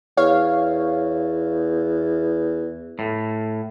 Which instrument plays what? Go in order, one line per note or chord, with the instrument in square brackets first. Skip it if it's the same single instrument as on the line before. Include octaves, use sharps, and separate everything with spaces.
[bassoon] E2 [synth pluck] C#5 F5
[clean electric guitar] A2